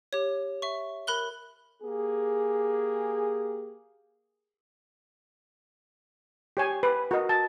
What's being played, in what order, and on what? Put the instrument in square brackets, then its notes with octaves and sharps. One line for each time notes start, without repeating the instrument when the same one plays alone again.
[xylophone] G4 C#5
E5 C#6
A#4 B5 F#6 G7
[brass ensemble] A#3 G4 G#4
[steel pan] G4 C#5 G#5
B4
F#4 A#4 D#5
A5